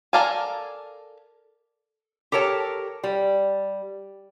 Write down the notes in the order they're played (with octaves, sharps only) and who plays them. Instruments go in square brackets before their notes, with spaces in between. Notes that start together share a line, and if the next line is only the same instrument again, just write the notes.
[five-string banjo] A4 A#4 D5 F5 G#5
[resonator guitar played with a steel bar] G4 A4 A#4 C#5 A5
G3